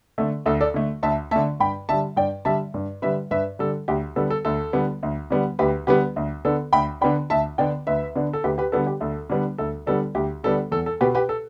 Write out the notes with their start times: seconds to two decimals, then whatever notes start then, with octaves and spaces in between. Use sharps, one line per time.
0.18 D3 A3 A4
0.46 D2 A4
0.61 A4 D5
0.74 D3 A3
1.03 D2 E5 A5
1.31 D3 A3 E5 A5
1.60 G2 G5 B5
1.89 D3 G3 E5 A5
2.16 G2 D5 G5
2.45 D3 G3 E5 A5
2.74 G2
3.02 D3 G3 B4 E5
3.31 G2 B4 E5
3.59 D3 G3 A4
3.88 D2 G4
4.16 D3 G3 B3 A4
4.30 A4
4.45 D2 A4
4.73 D3 G3 B3
5.03 D2
5.30 D3 G3 B3
5.59 D2 G4 B4
5.87 D3 G3 B3 G4 B4
6.16 D2
6.45 D3 B3 D4 A4
6.73 D2 G5 B5
7.01 D3 B3 D4 G5 B5
7.30 D2 E5 A5
7.58 D3 B3 D4 D5 G5
7.87 D2 B4 E5
8.16 D3 B3 D4
8.33 A4
8.44 D2 G4 B4
8.58 G4 B4
8.72 D3 G3 B3 D4 A4
8.87 G4
9.01 D2 A4
9.30 D3 G3 B3 D4
9.58 D2 A4
9.87 D3 G3 B3 D4 A4
10.15 D2 G4
10.44 D3 G3 B3 D4 A4
10.72 E2 A4
10.86 A4
11.01 B2 B3 G4 B4
11.15 G4 B4
11.29 A4